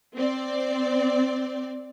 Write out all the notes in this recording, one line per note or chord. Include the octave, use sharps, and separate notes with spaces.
C4 D5